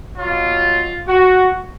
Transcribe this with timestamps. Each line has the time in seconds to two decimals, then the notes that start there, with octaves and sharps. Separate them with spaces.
0.16 F#3 F4
0.21 B2
1.06 F#4